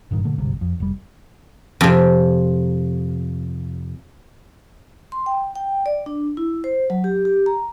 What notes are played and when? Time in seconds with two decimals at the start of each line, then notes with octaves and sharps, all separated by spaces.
0.11 F#1 G2 A#2 D#3
0.24 A#2 D3 A3
0.38 G#1 D2 G2 C3
0.61 F2
0.80 F1 G3
1.81 F2 C3
5.12 C6
5.26 G5
5.56 G5
5.86 D5
6.06 D4
6.37 E4
6.64 C5
6.90 F#3
7.04 G4
7.25 G4
7.46 A#5